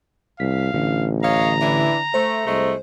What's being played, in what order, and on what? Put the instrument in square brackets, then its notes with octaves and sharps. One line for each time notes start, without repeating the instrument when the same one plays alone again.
[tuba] C2 [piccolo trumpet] F5 [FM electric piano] B6
[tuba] A1 [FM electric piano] D3
[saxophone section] C#5 D#5 F5 [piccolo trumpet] A#5
[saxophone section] E3 D4 E4
[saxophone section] A3 [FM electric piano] C5
[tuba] C2 [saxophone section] G#3 A3